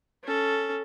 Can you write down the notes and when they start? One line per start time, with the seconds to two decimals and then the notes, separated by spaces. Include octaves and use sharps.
0.23 C#4 A4